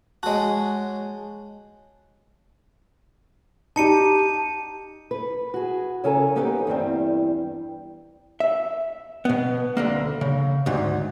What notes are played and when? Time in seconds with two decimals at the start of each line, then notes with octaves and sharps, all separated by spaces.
0.23 G#3 F#4 C#5 A5
3.76 D#4 G4 A5 C#7 D#7
5.11 B4
5.54 F#4 G#4
6.04 C#3 C#4 A4 A#4 G#5 A#5
6.35 A#3 B3 D#4 G4 A4 B4
6.67 E2 G2 G3 C4
8.40 E5
9.25 B2 B3
9.77 D2 D3 A#3
10.21 C#3
10.66 D2 G#2